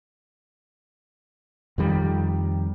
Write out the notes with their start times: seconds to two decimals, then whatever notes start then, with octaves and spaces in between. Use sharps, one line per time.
1.78 F2 D#3 G3